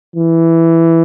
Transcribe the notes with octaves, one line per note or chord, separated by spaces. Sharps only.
E3